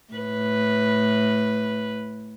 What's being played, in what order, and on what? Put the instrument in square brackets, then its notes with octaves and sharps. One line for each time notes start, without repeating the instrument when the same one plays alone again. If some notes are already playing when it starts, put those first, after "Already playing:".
[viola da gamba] A2 B4